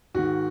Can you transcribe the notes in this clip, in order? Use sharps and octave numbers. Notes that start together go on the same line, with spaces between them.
G#2 D#3 F#4